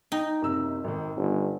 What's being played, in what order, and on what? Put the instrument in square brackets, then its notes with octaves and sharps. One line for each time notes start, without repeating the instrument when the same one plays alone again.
[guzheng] D#4 [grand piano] G5
[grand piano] F#1 C3 E6
G#1 D#3
[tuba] G1 [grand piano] C#3